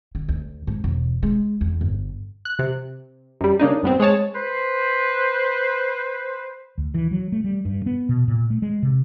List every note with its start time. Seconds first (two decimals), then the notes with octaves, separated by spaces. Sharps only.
0.15 D3
0.29 D2
0.67 G#2
0.84 E1
1.23 G#3
1.61 E2
1.81 G1
2.45 F#6
2.59 C3
3.41 F#2 G3
3.59 C#3 A#3 D4 D#4
3.83 G2 B3 C4
4.00 G#3 G#4 C#5 A5
4.34 B4 C5
6.78 D2
6.94 E3
7.11 F#3
7.32 A3
7.44 G3
7.65 G2
7.86 B3
8.09 B2
8.28 A#2
8.50 A3
8.62 G#3
8.83 C3